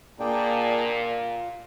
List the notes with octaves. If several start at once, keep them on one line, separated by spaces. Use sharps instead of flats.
A#2 A#3 D4 G#4 D5 G5
F4